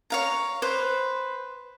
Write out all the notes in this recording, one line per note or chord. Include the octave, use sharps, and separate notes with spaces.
C#5 F5 A#5
B4 C5